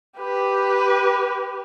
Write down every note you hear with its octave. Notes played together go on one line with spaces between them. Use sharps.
G4 B4